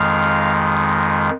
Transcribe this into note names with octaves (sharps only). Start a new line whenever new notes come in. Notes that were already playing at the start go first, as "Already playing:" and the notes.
Already playing: F2 D#3 G#3 F5